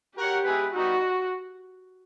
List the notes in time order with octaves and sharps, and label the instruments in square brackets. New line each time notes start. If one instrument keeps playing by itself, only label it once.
[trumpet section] F#4 A#4 C#5 F#5 [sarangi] G4
[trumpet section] G#3 B3 E4 G#4 B4
[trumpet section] G3 B3 D#4 [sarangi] F#4